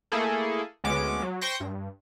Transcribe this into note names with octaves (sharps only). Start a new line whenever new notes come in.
A3 A#3 E4 G#4 A4
D2 G#3 B3 C#4 D6
F#3
C5 G5 C6 C#6 G6 A#6
G2